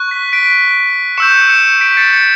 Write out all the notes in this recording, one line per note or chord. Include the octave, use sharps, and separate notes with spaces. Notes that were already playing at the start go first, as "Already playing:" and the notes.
Already playing: C#6 F#6
B6
B6 D7
C#6 E6 G6 C#7 E7
C#7 E7
B6 D7
A6 C#7
A6 C#7